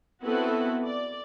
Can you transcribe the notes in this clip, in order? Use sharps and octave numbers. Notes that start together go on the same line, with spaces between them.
B3 C4 E4 F#4 A4 B4
D5